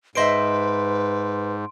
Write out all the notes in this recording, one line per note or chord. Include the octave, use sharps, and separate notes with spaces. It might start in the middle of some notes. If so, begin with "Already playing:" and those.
G#2 B4 C5 D#5 E5 C6 D7